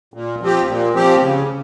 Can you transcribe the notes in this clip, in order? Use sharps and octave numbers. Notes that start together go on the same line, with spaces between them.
A#2
F3 C4 G4
A#2
F3 C4 G4
C#3